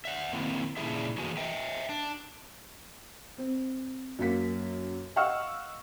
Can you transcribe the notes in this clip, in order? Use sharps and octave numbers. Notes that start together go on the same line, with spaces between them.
E5 F#5
D#3 A#3 C4 E4
A#2 C#3 D4 E4 G#4 E5
D3 E3 A#3 F#4 G#4 G#5
D#5 E5 G5
D4
C4
F#2 F#3 A#3 B6
D#5 F5 F#5 C#6 E6 F6